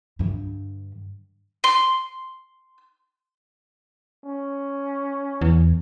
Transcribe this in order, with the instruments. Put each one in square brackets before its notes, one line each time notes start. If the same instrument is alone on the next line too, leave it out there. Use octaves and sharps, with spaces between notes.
[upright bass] G2 D3
[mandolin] C6
[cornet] C#4
[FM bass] E2